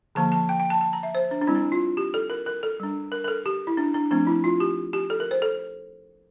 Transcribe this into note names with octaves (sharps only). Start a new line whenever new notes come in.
D3 F3 A#3 A5
A5
G5
G5
A5
A5
A#5
E5
C5
D4
D4
G3 C4 E4
D4
F4
G4
A4
A#4
A#4
A4
G3 D4
A#4
A#4
A4
G4
E4
D4
D4
F3 A3 C4 D4
E4
F4
G4
G4
A4
A#4
C5
A4